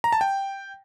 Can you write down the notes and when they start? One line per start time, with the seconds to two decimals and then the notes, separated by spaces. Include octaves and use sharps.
0.04 A#5
0.12 A5
0.21 G5